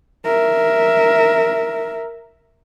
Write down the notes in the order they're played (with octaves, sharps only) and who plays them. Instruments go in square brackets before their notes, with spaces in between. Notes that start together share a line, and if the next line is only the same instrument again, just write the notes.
[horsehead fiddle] A#4 E5